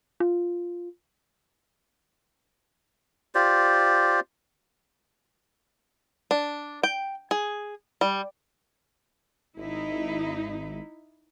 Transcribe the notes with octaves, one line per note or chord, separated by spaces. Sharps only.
F4
F4 G4 C5 D5
D4
G5
G#4
G3
G#1 D#4 E4